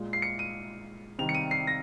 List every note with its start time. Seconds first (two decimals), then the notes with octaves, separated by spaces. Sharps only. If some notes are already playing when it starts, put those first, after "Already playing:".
Already playing: A#2 G#3
0.13 C7
0.22 C#7
0.39 D#7
1.19 C3 D#3 G3 F7
1.29 C#7
1.35 D#7
1.51 C7
1.67 A#6